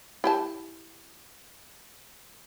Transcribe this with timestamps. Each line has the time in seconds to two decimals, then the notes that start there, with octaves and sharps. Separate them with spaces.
0.24 E4 G4 A5